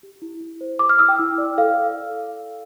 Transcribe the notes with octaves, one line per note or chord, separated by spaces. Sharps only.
G4
E4
E4
C5
G4 D6
F6
E4 E6
G5
E4
D5
A4 F5